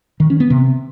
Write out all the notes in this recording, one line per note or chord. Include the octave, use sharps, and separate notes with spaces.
D#3
C#4
B3
C3